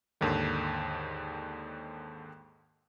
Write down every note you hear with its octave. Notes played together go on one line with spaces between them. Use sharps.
D#2 G#2 D3 D#3